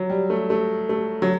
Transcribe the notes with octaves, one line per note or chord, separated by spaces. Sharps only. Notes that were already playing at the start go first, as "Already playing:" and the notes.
Already playing: F#3
G3
A3
A3
A3
F#3